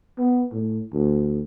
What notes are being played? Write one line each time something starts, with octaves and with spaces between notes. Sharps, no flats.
B3
A2
D2